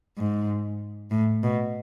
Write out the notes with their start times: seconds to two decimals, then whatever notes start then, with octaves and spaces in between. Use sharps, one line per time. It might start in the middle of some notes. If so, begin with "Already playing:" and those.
0.18 G#2
1.11 A2
1.43 B2